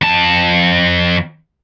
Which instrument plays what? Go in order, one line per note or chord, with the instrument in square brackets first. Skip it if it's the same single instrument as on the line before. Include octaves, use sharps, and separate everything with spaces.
[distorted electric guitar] F2 A5